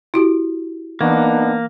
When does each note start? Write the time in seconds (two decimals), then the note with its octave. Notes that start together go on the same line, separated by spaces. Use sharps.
0.14 E4 F#4 G4
1.01 E3 A#3 B3 D4 D#4